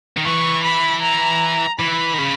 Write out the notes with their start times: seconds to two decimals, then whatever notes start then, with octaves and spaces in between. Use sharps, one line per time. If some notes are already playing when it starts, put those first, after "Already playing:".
0.17 D#3
0.25 E3 C#6
0.63 B5
1.02 A#5
1.79 E3 B5
2.13 D#3
2.18 C#3